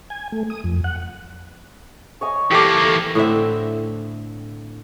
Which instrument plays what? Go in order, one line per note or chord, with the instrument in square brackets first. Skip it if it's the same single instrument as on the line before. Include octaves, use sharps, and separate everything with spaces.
[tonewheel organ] G#5
A3
D#6
F2
F#5
[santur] C#5 D#5 G#5
[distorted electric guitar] E2 A#3 [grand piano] G4 A4 D6
[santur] A3
[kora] A2 D3 C4 E5